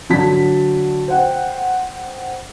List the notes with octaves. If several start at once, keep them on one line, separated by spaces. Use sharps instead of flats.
D3 F#3 A5 B6
C5 F#5 G5